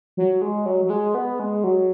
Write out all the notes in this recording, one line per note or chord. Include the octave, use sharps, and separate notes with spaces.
F#3
G#3
F#3
F#3
G#3
B3
G#3
F#3